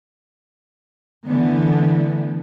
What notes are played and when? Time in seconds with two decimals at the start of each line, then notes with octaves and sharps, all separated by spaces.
1.26 D3 E3 A3 B3